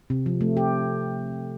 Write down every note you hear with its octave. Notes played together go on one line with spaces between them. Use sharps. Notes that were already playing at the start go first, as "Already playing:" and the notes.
C3
F3
A3
G4